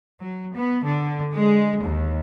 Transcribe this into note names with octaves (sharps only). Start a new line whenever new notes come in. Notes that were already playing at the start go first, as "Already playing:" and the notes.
F#3
B3
D3
G#3
D#2